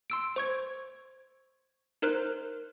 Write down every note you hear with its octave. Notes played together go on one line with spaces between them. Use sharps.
C6 E6 D7
C5 C#6 G#6
D#4 A#4 C5 F#6